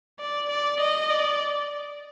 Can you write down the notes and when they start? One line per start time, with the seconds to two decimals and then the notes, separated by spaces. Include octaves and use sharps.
0.20 D5
0.50 D5
0.80 D#5
1.10 D5